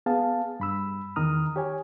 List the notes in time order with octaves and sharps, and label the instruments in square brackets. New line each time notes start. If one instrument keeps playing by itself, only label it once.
[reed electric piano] B3 G#4 F5 A5
G2 B5 E6
E2 D#3 A#5 D#6 F6
G4 C#5 G#5